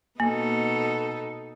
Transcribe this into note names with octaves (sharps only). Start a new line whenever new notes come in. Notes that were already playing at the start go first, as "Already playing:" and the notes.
B2 A#3 D#4 A4